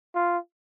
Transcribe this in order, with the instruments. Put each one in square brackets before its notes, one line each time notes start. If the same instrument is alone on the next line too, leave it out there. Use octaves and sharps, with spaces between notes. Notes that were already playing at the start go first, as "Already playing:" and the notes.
[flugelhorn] F4